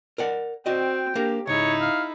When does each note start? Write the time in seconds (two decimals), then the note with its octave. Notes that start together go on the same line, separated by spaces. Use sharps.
0.18 A#4 D5 F#5
0.66 C4 F#4 D5 D#5 G5
1.15 A#3 D4 G4 A#4
1.47 C#2 G#2 D#4 E4 C#5
1.81 F5